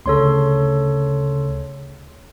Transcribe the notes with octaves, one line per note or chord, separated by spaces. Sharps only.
D2 C#3 A4 C#5 C6